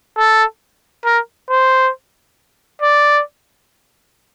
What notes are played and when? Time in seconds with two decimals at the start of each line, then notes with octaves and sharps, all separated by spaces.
0.17 A4
1.05 A#4
1.50 C5
2.82 D5